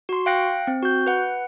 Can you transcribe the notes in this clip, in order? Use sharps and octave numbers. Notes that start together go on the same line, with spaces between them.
F#4 C6
F5 G5 F#6 A#6 C#7
C4
F#4 G6
B4 F#5